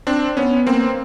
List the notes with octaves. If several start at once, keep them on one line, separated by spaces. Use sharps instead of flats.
C4 D4
B3 C#4
A#3 C4